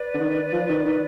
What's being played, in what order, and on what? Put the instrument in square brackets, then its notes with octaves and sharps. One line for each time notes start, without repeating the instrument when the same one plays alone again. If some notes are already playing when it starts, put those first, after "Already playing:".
Already playing: [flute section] B4 D5
[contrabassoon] D3
D#3
F3
D#3
D#3